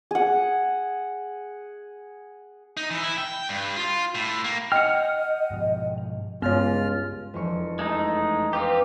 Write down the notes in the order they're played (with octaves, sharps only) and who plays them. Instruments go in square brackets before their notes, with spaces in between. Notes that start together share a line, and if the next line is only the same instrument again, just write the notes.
[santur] G#4 F#5
[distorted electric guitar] D#4
E3
E4
G5
G2
F4
A2
A#3
[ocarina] D#5 [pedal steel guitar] F#5 F6 [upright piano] G5
[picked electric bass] G#2 B2 F3
[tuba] C#2 [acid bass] G2 [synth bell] B3 C#5 [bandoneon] F4 F6
[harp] E1 F2 C#6
[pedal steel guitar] G#3 A3 D#4
[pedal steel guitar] C4 F4 G4 [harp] B4